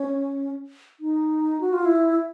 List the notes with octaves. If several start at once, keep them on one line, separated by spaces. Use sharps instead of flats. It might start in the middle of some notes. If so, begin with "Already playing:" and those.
Already playing: C#4
D#4
F#4
F4
E4